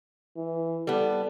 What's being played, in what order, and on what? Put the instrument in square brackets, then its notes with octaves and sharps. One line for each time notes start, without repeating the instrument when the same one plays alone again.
[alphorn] E3
[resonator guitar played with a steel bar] G3 B3 [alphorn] A4